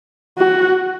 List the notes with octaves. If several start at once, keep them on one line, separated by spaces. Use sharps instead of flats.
F#4